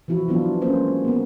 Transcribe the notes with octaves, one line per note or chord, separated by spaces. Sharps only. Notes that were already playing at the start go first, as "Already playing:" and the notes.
E3 F3 E4 F#4
E3 F#3 B3 D4 F4
G#3 A#3 C#4 C5
A#3 B3